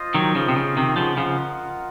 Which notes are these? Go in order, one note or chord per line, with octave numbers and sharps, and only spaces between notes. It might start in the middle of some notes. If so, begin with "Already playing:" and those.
Already playing: F4 C5 D#5
D#3 F#3
C#3 F3
C3
C#3
C3 D#3
C#3 F3 F4 A#4 D#5 F#5
C#3 F3